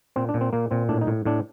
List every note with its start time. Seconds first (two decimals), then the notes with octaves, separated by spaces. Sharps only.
0.16 A#2 C4
0.29 D4
0.34 A#2
0.41 C4
0.53 A#2 A#3
0.71 A#2 C4
0.89 A2 D4
1.01 D#4
1.07 A2
1.25 A2 D4